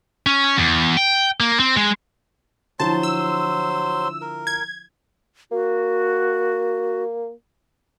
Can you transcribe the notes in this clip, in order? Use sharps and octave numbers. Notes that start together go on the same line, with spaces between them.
C#4
E2
G5
A#3
C4
G#3
D3 F3 F#3 E4 C5 A5 C6
E6
A#4
G#6
A#3 F#4